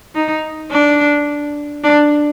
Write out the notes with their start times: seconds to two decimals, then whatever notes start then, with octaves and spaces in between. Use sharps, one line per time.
0.15 D#4
0.72 D4
1.84 D4